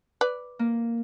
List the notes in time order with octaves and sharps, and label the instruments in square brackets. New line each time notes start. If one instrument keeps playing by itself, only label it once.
[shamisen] B4 D5
[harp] A#3